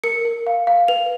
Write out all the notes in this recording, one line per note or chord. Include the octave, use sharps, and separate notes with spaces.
A#4 C#7
A#4
F5
F5
B4 F7